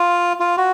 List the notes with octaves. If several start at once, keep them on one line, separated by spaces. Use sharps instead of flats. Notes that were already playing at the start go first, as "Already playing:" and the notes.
Already playing: F4
F4
F#4